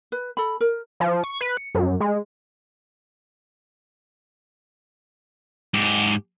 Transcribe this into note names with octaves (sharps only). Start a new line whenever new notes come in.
B4
A4 B5
A#4
F3
C#6
B4
C#7
F#2
G#3
G#2 G4